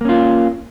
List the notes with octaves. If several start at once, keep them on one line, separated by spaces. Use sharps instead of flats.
A#3 C#4 F4